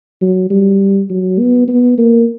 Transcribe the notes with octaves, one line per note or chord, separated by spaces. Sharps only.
F#3
G3
F#3
B3
B3
A#3